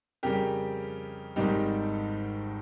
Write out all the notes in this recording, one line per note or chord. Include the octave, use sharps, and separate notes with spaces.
F2 C#3 G3 G4 A#4
G#1 G#2 D#3 G3 D#4 G4